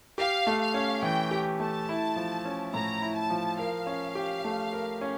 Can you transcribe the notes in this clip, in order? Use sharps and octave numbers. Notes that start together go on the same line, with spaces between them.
G4 F5
A3
F5
C#4
E3 G5
G4
A3 A5
E4
F3
C#4
A2 A#5
E4
A5
F3
A#4 F5
C#4
G4
A3
A#4
C#4